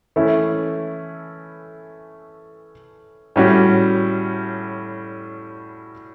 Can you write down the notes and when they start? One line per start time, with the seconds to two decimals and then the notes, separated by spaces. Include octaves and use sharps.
0.16 E3 A3 C#4 E4
3.36 A2 G3 C#4 F#4